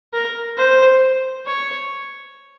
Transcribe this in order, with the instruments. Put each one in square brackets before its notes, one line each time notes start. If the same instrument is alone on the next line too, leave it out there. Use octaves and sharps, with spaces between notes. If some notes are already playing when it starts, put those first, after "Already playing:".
[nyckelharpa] A#4
C5
C#5